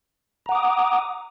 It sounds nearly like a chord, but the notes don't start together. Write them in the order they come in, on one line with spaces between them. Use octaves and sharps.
A#5 F#5 D6 D#6